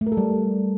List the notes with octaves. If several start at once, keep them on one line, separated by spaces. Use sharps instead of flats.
A3
A#4
A4
G3